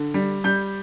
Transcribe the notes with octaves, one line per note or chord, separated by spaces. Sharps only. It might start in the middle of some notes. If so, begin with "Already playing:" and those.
Already playing: D3
G3
G3 G6